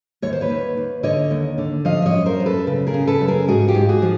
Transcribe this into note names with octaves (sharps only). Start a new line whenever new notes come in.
D#2 C#5
C5
B4 C#5
D#2
D#2
D3 C#5 D#5
D#2
D3
F3 D#5 F5
E5
C#5 D#5
F#2
A#4 C5
F#2
A4 B4
C#3
G#4 A#4
C#3
A4 B4
F#2
G#4 A#4
G#2 F#4 G#4
F4 G4
G#2
F#4 G#4
F3